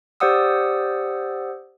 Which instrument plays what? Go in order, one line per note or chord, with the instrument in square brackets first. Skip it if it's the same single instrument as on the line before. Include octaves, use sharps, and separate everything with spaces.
[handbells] G4 C5 D5 F#5 D#6 E6